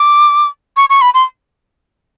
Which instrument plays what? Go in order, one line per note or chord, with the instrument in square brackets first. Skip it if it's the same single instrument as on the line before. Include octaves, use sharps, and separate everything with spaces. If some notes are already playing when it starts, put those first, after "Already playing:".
Already playing: [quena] D6
C#6
C#6
B5
C6